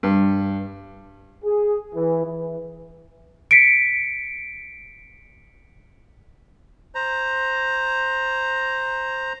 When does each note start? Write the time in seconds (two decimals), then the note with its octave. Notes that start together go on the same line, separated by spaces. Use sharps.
0.03 G2
1.44 G#4
1.94 E3
2.25 E3
3.51 B6 C#7 D7
6.95 C5 A#5